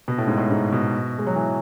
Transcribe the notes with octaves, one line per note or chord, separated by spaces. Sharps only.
B2
A2
G#2
A2
G#2
B2
G#3
F#3
E3